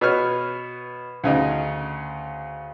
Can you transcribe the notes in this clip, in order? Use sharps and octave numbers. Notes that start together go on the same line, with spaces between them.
B2 B4 C#5 F6
D2 C#3 D#4